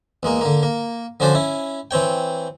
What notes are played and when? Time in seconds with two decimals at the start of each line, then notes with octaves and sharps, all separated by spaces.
0.23 E2 G#3 A#3
0.41 D3 A#3
0.63 A#3
1.20 D3 F3 C#4 F#4 C5 D5
1.35 C#4 E4
1.91 E3 C4 C#5 G5